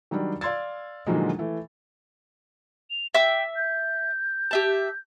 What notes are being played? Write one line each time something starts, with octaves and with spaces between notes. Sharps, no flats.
D#3 F#3 G3 D4
D5 F5 C6 E6 G#6 A6
A#2 D3 D#3 F3 F#3 G#3
E3 A3
F7
E5 G5 D6 E6
G6
G4 E5 A5